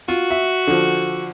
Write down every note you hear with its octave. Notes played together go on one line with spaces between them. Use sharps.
F4 F#4
E5
D3 F3